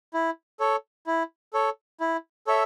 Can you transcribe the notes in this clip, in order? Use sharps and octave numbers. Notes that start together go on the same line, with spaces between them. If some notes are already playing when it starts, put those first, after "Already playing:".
E4
A4 C#5
E4
A4 C#5
E4
A4 C#5 E5